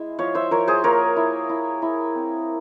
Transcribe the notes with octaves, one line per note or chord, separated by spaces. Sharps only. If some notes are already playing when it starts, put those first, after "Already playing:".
Already playing: G#3 E4
F3 C#5 F5
C5 E5
F3 A#4 C#5
G#4 C5
A#3 A#4 C#5
E4
E4
E4
C4